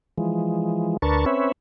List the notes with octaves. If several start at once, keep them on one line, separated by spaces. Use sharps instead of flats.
E3 F3 G#3
D2 D4 A#4 B4 A5 C#6
C4 C#4 B4 C#5 E5